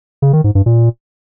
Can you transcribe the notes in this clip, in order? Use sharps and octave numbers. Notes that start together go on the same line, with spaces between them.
C#3
D#3
G#2
G2
A#2